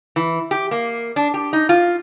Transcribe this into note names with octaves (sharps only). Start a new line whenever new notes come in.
E3
G4
A#3
D4
G4
D#4
F4